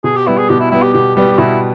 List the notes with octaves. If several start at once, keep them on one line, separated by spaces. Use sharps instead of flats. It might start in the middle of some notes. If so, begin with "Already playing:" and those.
B2 G#4
G4
G3 B3 E4
G#4
B2 G4
E4
G3 B3 E4
G4
B2 G4
G3 B3 G4
G4
B2 E4